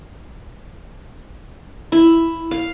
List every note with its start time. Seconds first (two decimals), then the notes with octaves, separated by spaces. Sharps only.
1.92 E4
2.51 F5